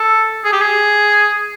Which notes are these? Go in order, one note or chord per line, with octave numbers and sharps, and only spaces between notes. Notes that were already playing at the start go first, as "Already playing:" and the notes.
Already playing: A4
G#4
G4
G#4